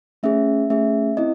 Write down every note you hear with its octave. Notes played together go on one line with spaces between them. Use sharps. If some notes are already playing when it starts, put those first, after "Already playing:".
A3 C#4 G#4 E5
A3 C#4 G#4 E5
C4 E4 D#5